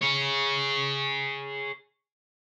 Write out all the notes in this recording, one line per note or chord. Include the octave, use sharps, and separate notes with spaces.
G#4 C#5